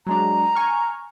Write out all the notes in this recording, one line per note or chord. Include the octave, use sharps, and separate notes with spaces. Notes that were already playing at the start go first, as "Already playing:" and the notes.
F#3 G#3 D4 A#5
G#5 C#6 F6